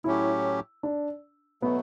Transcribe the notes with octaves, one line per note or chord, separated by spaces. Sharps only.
A2 F#3 C#4 E4 G4
D4
B2 F#3 A3 B3